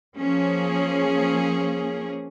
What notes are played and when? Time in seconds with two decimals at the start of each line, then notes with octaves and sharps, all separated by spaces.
0.15 F3 A#3 C#4 G#4